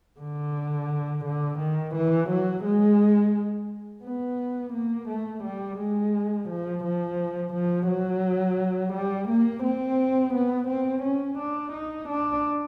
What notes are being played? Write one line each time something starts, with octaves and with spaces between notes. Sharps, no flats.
D3
D3
D#3
E3
F#3
G#3
B3
A#3
A3
G3
G#3
F3
F3
F3
F#3
G3
A#3
C4
B3
C4
C#4
D4
D#4
D4